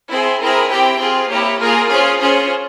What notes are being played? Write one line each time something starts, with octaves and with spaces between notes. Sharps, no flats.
C4 E4 G#4 C5
C4 E4 G#4 A#4
C4 E4 G4 G5
C4 F4 G#4
A#3 E4 G4 C#5
A#3 F4 G#4 A#4
C#4 F4 G#4 C5
C#4 F4 G#4 C5